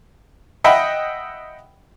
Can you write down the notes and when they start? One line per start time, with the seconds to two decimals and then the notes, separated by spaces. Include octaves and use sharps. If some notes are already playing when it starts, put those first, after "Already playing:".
0.64 D#5 E5 F#5 G5 B5